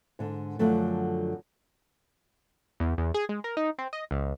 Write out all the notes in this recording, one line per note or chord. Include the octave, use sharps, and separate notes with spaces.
G#2 D3
F#2 D3 F3 F#3 A3
E2
E2
G#4
G#3
A#4
D#4
C4
D#5
C#2